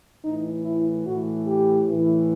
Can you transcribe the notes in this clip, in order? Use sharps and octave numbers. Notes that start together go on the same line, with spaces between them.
A2 E3 D#4
E4
A2 E3 F#4
G4
A2 E3